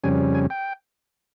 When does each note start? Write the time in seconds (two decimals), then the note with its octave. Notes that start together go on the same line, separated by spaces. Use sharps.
0.04 F2 C#3 G3 C#4 G#5
0.35 G#5
0.50 G5